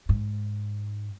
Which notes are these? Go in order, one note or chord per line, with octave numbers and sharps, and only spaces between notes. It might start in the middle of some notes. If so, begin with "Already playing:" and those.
G#2